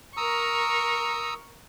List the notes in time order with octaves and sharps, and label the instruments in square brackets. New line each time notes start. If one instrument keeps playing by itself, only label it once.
[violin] A#4 C#6 [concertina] A#5 D#6 E6